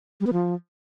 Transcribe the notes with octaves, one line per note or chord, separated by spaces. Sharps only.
G3
B3
F3